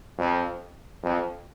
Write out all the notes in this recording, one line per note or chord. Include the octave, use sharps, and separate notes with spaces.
F2
F2